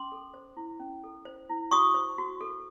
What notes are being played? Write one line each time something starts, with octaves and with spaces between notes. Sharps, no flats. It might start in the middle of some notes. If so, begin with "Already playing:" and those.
Already playing: C#4 C6 D6
A4
C5
E4
C#4
A4
C5
E4
F#4 C#6 D#6
C5
F#4
A4